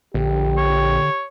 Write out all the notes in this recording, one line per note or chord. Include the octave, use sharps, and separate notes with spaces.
A#1 D3 G4
C#5